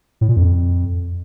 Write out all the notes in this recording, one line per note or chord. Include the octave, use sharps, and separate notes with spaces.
A2
A#2
F2